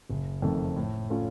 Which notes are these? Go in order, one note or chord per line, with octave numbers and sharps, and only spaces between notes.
F#1
F2 D#3 A3
A2
A3 C#4 F4